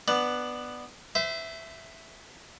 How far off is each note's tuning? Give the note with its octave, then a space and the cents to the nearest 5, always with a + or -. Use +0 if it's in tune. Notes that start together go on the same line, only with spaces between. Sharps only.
B3 +0 D4 +15
C5 -35 E5 +0